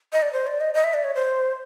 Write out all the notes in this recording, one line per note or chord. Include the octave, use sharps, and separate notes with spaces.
D#5
D5
C5
D5
D#5
D#5
E5
D5
C#5
C5